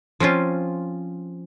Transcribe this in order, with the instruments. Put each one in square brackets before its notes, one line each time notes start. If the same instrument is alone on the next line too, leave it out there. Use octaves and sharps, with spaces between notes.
[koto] F3 C4 C#4 F4